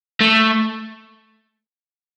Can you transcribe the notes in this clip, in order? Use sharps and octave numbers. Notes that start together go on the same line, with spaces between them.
A3